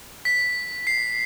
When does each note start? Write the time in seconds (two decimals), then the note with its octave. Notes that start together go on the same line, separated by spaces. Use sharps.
0.25 B6
0.87 C7